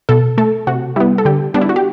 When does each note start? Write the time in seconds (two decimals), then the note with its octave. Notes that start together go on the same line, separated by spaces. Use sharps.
0.09 B2 A4
0.38 A3 A4
0.67 C3 F#4
0.96 G3 B3 E4
1.18 A4
1.25 D3 G4
1.54 G3 B3 D4
1.61 E4
1.69 F#4
1.76 G4